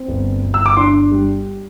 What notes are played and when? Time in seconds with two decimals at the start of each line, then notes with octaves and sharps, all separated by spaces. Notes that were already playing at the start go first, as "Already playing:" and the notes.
Already playing: C4
0.08 G1
0.43 G1
0.54 E6
0.66 D6
0.77 D4 C6
1.11 G3